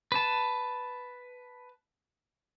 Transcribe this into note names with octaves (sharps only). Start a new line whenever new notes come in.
B4 A5